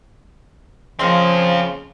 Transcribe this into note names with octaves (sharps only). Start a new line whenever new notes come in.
C#3 F3 A#3 C4 F4 D#5 C6